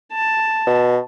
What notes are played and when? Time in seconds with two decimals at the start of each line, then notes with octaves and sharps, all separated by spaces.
0.12 A5
0.67 B2